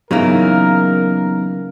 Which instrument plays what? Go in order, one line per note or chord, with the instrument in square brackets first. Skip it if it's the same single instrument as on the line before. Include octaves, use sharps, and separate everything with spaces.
[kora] C#3 E3 A#3 [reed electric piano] F#3 B3 D#4 [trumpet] A#4